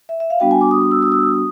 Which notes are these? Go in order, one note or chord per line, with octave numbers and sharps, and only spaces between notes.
E5
E5
F5
G3 B3 D4 F#4 G5
G#5
D6
D#6
D#6
E6
D#6
E6
D#6